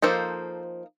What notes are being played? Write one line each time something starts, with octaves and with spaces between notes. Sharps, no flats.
F3 A#3 D#4 A4 C5